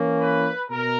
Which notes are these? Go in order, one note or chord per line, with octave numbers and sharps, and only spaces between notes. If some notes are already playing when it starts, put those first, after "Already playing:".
Already playing: E3 A#3 C#4
B4
B2 A#4